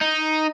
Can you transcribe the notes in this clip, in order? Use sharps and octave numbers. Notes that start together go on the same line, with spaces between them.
D#4